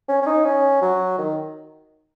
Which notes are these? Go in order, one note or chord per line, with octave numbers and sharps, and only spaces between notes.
C#4
C#4
D#4
C#4
F#3
D#3